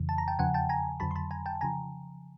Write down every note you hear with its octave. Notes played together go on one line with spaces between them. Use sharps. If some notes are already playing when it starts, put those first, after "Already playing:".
Already playing: F2 C#3 E3
A5
A#5
G5 A5
E2 C#3 F3 F#5 G#5
G5 A5
G#5 A#5
F2 D3 F#3 A5 B5
C6
A5 B5
G#5 A#5
G5 A5
C#3 F3 G#5 A#5